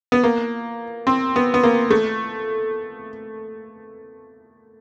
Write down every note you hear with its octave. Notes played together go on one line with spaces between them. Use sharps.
B3
A#3
C4
B3
B3
A#3
A3